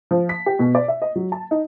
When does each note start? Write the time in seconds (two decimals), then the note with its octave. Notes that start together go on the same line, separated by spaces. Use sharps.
0.11 F3
0.29 B6
0.46 G4
0.59 B2
0.75 D5
0.88 E5
1.02 D#5
1.16 F#3
1.32 A5
1.51 D#4